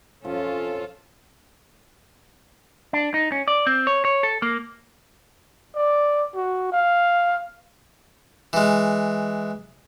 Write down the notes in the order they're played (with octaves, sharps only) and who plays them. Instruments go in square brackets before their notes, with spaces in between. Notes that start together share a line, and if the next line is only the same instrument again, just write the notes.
[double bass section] F2 C#4 [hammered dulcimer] F3 E5 [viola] F4 A4
[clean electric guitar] D4
D#4
C#4
D5
C4
C#5
C#5
A4
A#3
[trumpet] D5
F#4
F5
[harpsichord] E3 G#3